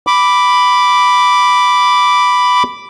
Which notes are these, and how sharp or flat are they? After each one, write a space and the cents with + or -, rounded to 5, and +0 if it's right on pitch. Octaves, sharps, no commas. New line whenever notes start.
B5 +0 D6 -5